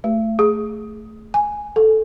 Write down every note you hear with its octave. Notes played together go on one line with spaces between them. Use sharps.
A3
G#4
G#5
A4